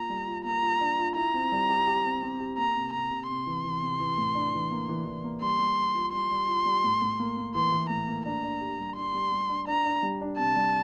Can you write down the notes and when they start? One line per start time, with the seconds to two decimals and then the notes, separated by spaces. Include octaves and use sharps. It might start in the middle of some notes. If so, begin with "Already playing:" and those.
Already playing: A#3 F4 A#5
0.10 G3
0.27 F4
0.44 A#3 A#5
0.63 F4
0.81 D4
0.98 F4
1.16 E4 A#5
1.34 C4
1.52 G3
1.69 G4
1.87 G4
2.05 C4
2.23 C4
2.40 G4
2.57 A#3 A#5
2.76 C3
2.93 C3 A#5
3.11 C3
3.29 C3 C6
3.46 E3
3.64 E3
3.82 C3
4.00 E3
4.18 A2
4.35 D4
4.54 E3
4.71 A#3
4.89 E3
5.06 E3
5.24 A#3
5.42 G3 C6
5.59 G3
5.77 G3
5.95 F4
6.13 G3 C6
6.31 G3
6.48 F4
6.66 G3
6.84 A2
7.02 A2
7.19 A#3
7.37 A#3
7.55 E3 C6
7.72 E3
7.89 A2 A#5
8.07 A#3
8.25 D4 A#5
8.43 D4
8.61 G4
8.79 G3
8.97 D4 C6
9.14 G3
9.32 G3
9.49 D4
9.67 D4 A#5
9.85 D4
10.03 G3
10.21 D4
10.38 C3 A5
10.56 G3